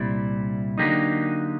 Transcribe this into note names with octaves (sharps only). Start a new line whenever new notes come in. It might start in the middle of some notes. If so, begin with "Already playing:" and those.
Already playing: C2 A#2 G3 C4 E4
D3 F#3 A#3 D#4 G4